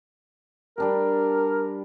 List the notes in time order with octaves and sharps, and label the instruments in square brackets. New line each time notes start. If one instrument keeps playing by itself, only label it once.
[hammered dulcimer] G3 D4 G4 [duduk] A#4